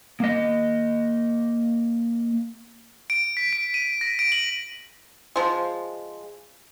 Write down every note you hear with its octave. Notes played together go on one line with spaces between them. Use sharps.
A#3 D#5
D7
B6
D7
D#7
A#6
D7
F#7
F3 G#3